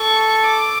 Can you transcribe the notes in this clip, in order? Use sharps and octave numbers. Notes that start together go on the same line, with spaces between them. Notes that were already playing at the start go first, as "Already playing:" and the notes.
Already playing: A4 C#6
D6